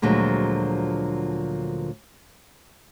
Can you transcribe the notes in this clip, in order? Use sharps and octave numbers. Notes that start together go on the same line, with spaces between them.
D2 A#2 D3 F3 F#3 G#3